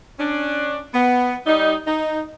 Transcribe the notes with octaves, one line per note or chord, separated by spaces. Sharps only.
C#4 D4
B3
G3 D#4
D#4